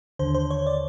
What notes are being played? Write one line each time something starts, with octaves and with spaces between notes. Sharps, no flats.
D#2 D3 C5
C5
C#5
D5